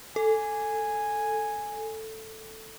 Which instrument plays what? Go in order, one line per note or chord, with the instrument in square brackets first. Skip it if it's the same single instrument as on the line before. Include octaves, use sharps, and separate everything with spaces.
[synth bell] A4 [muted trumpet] G#5